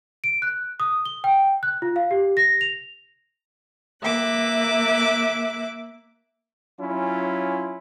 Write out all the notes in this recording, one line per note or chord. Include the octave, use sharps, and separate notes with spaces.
D7
F#6
D#6
G7
G5
F#6
F4
F5
G4
A#6
F7
A#3 E5 D6 F#6
F#3 C#4 E4 F4